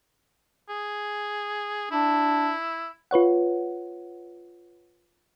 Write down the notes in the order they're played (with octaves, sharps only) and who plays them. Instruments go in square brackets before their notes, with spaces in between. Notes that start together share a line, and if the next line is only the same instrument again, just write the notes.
[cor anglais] G#4
[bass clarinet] D4 [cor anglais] E4
[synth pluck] F4 B4 C#5 F#5